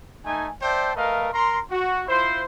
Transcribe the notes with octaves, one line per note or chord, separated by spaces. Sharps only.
A3 D#4 G#5
C5 D5 E5 G5 A5
A3 A#4 B4 D#5 F5
A#4 A#5 C6
F#4
E4 F4 C5